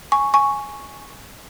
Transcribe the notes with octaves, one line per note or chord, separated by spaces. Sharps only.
G#5 C#6
G#5 C#6